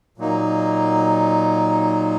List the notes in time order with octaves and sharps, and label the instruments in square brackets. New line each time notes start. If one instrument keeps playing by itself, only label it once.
[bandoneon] A#2 F#3 A#3 D#4